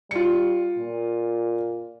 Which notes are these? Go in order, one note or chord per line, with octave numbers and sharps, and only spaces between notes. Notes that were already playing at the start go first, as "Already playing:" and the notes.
G3 F4 C#7
A#2